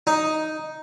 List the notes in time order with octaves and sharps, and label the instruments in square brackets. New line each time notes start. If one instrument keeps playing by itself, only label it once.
[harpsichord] D#4